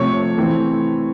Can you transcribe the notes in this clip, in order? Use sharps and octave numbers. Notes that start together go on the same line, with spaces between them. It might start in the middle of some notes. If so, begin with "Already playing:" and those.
Already playing: C3 F3 A3 C#5 C#6
E3 A3 C4